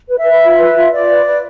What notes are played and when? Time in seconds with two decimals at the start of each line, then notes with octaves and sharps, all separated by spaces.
0.08 B4
0.17 E5
0.25 B4
0.43 F4
0.59 B4
0.76 F4
0.93 F4 D5
1.08 B4
1.26 B4